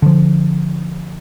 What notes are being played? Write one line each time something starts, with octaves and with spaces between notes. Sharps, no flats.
D3 F3